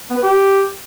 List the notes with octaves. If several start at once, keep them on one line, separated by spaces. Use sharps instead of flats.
B3
B4
G4